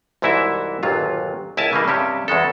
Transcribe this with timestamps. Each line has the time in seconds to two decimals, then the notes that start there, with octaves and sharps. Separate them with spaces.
0.22 C2 G#2 E3 E4 F#4 E5
0.83 G1 D#2 A#2 F#3 F4
1.57 C#2 E4 A#4 G#5 A5
1.73 C#3 E3 G3 A#3
1.88 G2 C3 C#4 G4 E5
2.28 E2 C#3 G#3 A4